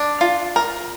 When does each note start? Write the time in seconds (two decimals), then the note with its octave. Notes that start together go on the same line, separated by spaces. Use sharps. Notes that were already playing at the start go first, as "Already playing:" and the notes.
Already playing: D4
0.21 F4
0.56 A#4